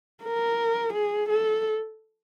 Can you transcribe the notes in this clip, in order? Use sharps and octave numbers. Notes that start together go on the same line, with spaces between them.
A#4
G#4
A4